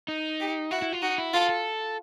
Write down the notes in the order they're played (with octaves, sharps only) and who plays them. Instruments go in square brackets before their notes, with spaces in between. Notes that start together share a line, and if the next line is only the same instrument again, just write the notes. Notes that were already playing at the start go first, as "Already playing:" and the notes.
[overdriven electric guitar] D#4
[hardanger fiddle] G4
[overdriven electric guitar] E4 [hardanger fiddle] F#4
[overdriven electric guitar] E4
F4
[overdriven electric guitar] D#4 [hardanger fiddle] F#4
[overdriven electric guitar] E4
[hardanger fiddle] F4 [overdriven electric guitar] A4
[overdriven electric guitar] A4